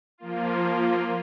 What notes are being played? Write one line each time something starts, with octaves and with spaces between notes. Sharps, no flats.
F3 A#3 F4